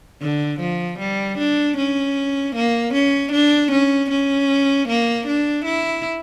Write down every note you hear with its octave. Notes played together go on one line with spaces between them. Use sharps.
D3
F3
G3
D4
C#4
A#3
C#4
D4
C#4
C#4
A#3
D4
E4